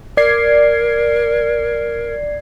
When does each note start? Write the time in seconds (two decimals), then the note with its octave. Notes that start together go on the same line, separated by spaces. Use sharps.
0.17 A#4 D5 G#6 C7